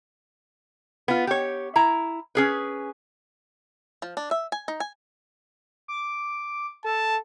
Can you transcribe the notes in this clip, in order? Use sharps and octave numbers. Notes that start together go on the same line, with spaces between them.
B3 F4
G4 C#5
E4 A#5
C#4 G#4 B4
F3
D4
E5
G#5
D#4
G#5
D6
A4 A5